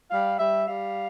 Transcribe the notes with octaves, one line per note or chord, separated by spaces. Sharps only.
G3 F5
G3 E5
G3 F5